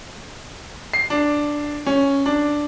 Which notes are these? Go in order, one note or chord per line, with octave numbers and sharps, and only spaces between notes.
C7
D4
C#4
D4